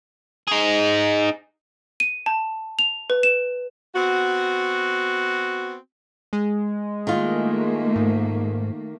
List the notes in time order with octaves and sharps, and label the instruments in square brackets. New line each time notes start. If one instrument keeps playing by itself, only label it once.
[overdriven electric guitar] D#4 G#4
[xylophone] D#7
A5
F7
B4
E7
[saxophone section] B3 C4 F#4
[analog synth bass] G#3
[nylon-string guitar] D#3 F4 [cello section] A3 A#3
[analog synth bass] G#2